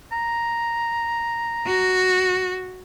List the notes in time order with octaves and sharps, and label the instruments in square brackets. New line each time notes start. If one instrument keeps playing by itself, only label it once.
[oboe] A#5
[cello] F#4